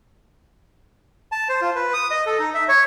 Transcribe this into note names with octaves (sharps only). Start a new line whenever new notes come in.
A5
C5
F4
B4
D#6
D#5
A4
D#4
E5
C#5